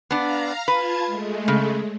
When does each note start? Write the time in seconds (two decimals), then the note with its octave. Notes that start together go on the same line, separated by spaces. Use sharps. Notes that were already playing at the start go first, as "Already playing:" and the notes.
0.11 B3 D4 F5 A#5
0.68 F4 B4 A5 G#6
1.06 G#3 A3
1.48 C#3